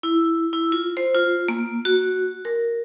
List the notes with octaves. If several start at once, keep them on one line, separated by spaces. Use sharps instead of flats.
E4
E4
F4
C5
F4
A#3
F#4
A#4